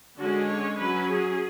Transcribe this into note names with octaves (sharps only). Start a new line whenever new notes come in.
D3 G#3 C#4 F#4
C#5
F#3 C#4 B4
G#4